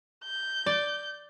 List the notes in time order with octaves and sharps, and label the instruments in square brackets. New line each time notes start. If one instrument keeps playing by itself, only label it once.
[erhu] G6
[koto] D5